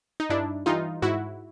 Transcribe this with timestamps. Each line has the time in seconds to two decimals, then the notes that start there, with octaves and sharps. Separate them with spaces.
0.20 D#4
0.30 G2 D4 E4
0.66 E3 G3 D#4 F4
1.02 G#2 E4 F#4